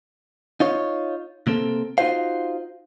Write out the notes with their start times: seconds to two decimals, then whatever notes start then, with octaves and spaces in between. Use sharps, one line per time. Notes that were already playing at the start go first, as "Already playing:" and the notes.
0.60 D#4 F4 C#5
1.47 C3 A#3 C4 A4
1.98 D#4 F4 F#4 C5 F5